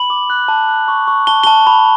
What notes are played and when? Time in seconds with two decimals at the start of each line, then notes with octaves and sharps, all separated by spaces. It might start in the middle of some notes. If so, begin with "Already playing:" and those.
Already playing: B5 F#7
0.10 D6
0.30 F#6
0.48 A5
0.68 F#6
0.88 C#6
1.07 C#6
1.27 A5 G7
1.43 A5 G7
1.67 B5